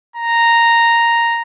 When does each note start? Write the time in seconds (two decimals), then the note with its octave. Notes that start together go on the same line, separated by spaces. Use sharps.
0.16 A#5